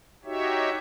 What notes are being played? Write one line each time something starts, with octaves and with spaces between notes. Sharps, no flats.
D#4 F#4 G4 C#5 E5